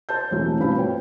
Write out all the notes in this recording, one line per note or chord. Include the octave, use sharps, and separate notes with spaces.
C5 A5 G6
E1 A1 E3 A3 C4 F#4
G2 B2 C4 F4 F5 B5
B4 C#5 G5